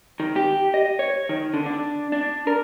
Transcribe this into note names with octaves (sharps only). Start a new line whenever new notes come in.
D#3
G4
D#5
C#5
D#3
D3
D4
D4
A#4